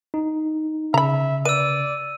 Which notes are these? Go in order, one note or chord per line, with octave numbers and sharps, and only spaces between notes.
D#4
C#3 E5 A#5 B5
B4 D5 E6 D#7